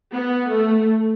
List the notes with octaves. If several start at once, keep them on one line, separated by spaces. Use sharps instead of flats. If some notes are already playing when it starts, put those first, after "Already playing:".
B3
A3